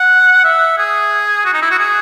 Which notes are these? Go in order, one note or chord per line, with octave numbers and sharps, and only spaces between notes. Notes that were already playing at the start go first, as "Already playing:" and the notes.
Already playing: F#5
E5
G#4
F#4
D#4
E4
F#4
G#4